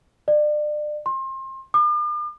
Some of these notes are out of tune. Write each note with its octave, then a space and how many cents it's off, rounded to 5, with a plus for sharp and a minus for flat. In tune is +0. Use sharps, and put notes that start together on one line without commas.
D5 +30
C6 +30
D6 +45